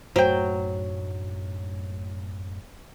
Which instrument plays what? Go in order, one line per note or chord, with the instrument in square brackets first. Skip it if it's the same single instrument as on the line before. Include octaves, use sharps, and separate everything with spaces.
[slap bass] F#2 A2 A3 [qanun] F#3 [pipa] A#4 G5 [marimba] C5